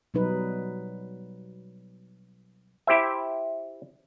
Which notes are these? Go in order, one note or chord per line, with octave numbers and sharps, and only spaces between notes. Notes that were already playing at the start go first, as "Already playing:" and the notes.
B2 F#3 G3 D#4 B4
E4 G4 C5 E5